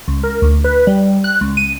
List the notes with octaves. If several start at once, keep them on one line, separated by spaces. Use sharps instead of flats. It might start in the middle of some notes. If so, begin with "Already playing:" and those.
C#2
A#4
D2
B4
G3
F#6
C#2
D#7